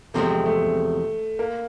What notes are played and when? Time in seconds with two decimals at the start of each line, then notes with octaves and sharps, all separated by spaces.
0.14 E2 C3 F3 G#3 A3 C4
0.46 A3
1.39 A#3